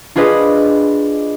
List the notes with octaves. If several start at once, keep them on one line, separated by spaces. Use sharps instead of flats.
D4 F4 G#4 B4 D#5